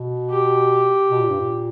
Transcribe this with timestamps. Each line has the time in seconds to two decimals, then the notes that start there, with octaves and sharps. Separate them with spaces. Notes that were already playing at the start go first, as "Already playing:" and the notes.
Already playing: B2
0.30 G4
1.11 B2
1.20 A#2
1.30 G2
1.40 A#2